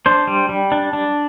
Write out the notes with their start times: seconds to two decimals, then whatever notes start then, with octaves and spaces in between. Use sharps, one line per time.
0.06 D4 C5
0.27 G3
0.49 G3
0.72 D4
0.93 D4